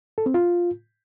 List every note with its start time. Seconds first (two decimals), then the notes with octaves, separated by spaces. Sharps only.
0.18 A4
0.26 C4
0.34 F4